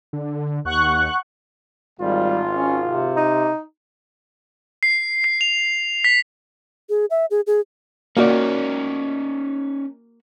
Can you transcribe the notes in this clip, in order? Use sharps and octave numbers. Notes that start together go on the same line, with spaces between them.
D3
D#2 F#5 C#6 F#6
G#1 G3 F4
C#4
C3
D#4
C7
C7
F7
B6
G#4
E5
G#4
G#4
A#3 C#4 D#4 F#4 D5